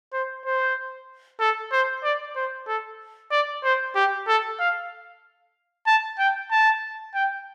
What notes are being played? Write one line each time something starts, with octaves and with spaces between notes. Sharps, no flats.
C5
C5
A4
C5
D5
C5
A4
D5
C5
G4
A4
F5
A5
G5
A5
G5